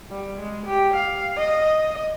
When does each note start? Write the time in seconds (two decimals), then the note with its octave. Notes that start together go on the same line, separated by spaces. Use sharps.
0.10 G3
0.39 G#3
0.66 G4
0.94 F5
1.37 D#5
1.79 D#5